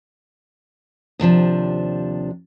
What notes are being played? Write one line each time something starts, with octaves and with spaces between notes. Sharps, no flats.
D#2 C3 F3 D4